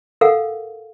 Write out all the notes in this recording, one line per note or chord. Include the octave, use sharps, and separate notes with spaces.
A4 A#4 F5 F#5